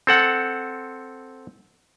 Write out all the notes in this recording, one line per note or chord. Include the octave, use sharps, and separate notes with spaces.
C4 A4 F#5